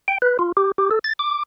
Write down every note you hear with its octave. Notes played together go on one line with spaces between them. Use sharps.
G5
B4
F4
G4
G4
A4
A6
D6